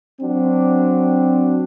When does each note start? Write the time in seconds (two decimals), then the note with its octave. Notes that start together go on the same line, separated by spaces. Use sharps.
0.21 F#3 C4 D4 F#4